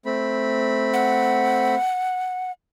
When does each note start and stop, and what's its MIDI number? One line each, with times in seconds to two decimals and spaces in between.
0.05 1.75 57
0.05 1.75 60
0.05 1.75 83
0.93 2.51 78